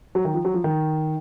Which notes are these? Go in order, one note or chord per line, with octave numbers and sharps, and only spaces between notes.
F#3
D#3
F3
F#3
F3
D#3